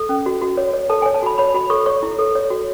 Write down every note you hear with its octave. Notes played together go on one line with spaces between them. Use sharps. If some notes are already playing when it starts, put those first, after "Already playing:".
Already playing: A4
C#4
F#4
F#4
C#5
C#5
A4 A5
G#5
C#5
A5
F#4 B5
C#5 B5
F#4 B5
A4 C#6
C#5 C#6
E4
A4
C#5
F#4